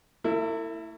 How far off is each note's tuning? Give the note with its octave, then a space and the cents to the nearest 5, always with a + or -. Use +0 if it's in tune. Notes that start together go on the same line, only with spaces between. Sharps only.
A3 +45 E4 +0